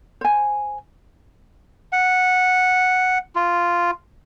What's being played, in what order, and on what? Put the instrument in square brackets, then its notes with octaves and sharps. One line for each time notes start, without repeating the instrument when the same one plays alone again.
[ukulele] C5 G#5
[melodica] F#5
F4